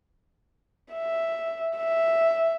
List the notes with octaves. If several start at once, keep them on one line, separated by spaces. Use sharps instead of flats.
E5
E5